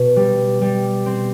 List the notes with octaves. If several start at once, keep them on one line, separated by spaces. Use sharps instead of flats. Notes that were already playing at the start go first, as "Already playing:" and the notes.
Already playing: B2
G3
G3
C4